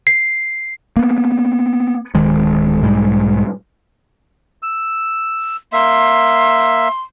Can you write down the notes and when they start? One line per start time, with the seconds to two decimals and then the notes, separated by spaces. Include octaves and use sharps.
0.07 C7
0.97 A#3 B3
2.15 D1 D#3 G#3
2.82 B1 G#2 G3 G#3
4.63 E6
5.73 A#3 E5 C6